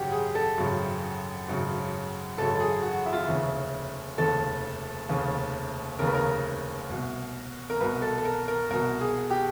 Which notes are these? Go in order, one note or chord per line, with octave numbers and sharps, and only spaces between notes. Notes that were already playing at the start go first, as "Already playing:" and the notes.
Already playing: G#1 F#2 C#3 F#4 G4
G#4
A4
G#1 F#2 C#3
G#1 F#2 C#3
G#1 F#2 C#3 A4
A4
G#4
F#4
E4
F4
E4
F1 D#2 C#3
F1 D#2 C#3 A4
F1 D#2 C#3
F1 D#2 C#3 A#4
B4
A#4
C2 B2
A#4
C2 B2 B4
A4
A4
A#4
A#4
C2 B2 A#4
G#4
G4